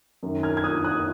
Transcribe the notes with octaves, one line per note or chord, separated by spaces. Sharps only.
F#2 D#3
F6 G#6
G#6
D#6 F#6
D#6 F#6